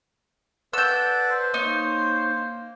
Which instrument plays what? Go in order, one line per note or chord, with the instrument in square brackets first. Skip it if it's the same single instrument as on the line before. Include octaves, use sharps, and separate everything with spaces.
[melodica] A4 D5 F#5 [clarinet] B4 [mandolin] E6 G6
[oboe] C5
[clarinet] A#3 [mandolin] D#4 [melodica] C#5